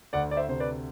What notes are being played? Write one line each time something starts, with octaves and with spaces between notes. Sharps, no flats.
D2 D5 F#5
D5
C5 E5
C3 C5
B4 D5